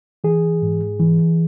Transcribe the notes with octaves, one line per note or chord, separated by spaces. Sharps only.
E3 G#4
G#2
E3